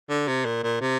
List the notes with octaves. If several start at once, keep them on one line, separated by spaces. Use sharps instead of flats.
D3
C3
A#2
A#2
C3